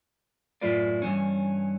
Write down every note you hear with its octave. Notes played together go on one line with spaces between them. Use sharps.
F#2 A2 E4 F4 B4 D5
G2 E3 C#4